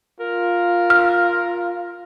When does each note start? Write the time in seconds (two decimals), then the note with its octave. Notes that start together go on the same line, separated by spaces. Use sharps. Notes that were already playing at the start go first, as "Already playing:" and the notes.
0.20 F4 A#4
0.90 F6